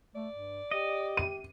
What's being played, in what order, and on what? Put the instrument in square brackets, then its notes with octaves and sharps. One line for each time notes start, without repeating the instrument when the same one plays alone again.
[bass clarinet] A3 [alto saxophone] D5
[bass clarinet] G2
[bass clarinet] G4 [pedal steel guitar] D#5
[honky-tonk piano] D#7